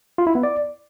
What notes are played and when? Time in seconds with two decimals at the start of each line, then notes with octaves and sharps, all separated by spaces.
0.18 F4
0.27 E4
0.35 B3
0.43 D5